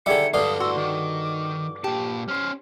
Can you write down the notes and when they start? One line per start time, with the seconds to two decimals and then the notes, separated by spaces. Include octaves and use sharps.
0.06 D3 D#3 G3 G#4 E5 C#7
0.34 G2 D3 A4 F5 D#6
0.60 A2 F#4 C6 E6
0.77 D#3 D6
1.84 A#2 G4 A5
2.28 C#4 C5 F6